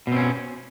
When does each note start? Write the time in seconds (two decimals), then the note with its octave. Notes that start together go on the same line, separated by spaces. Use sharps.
0.07 B2
0.12 C4
0.16 C#4